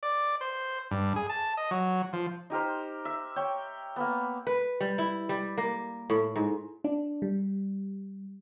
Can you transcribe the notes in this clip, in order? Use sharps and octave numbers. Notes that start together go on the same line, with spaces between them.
D5
C5
G2
G#4
A5
D#5
F#3
F3
D#4 G4 A#4 C5
E5
C#5 G5
A#3 B3
B4
G3
E4
G3
A#3
A2
G#2
D4
G3